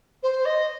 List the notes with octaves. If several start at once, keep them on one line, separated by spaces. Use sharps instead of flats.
C5
D#5